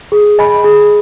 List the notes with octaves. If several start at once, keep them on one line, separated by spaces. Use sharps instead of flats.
G#4
D#5 G#5 B5
G#4